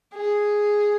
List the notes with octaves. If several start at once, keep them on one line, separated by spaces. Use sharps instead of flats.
G#4